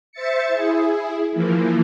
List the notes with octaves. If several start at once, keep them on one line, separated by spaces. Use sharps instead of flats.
C5 E5 A6 C#7
E4 G#4
E3 F3 A#3